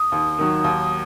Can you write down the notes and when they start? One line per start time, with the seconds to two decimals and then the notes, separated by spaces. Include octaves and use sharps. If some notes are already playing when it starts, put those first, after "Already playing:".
Already playing: D#6
0.12 D#2
0.39 D#3 F#3
0.64 D#2